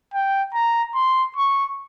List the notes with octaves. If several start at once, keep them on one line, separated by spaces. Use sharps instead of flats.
G5
A#5
C6
C#6